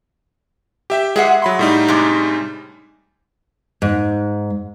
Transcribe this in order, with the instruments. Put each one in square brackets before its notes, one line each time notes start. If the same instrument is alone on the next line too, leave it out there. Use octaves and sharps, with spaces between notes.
[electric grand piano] G4 E5 G5
[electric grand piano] G#3 [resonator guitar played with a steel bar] G#4 E5 F#5
[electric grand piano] F#3 B5 C6
A2 G3 D#4
[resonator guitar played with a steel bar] C3 G#3 D4
[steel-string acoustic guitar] G#2